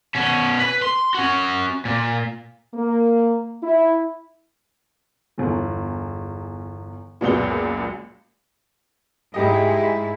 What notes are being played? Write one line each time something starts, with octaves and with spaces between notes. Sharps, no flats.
B2 C#4
B4
C6
C#4 F#4
A#2
A#3
E4
G1 E2
C#2 F#2 A#2 B3 G7
G#2 G#3 E4 G4 D#5